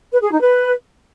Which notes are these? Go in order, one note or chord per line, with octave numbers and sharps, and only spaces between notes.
B4
G#4
D#4
B4